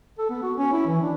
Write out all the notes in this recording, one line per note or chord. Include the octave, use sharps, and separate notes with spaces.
A4
B3
F#4
C#4
E4
E3
D4